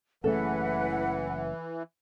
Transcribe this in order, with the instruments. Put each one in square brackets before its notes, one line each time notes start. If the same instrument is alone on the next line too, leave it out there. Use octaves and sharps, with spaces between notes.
[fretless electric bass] F#1 C#3 A3 [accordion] E3 [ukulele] A4 [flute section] B4 F#5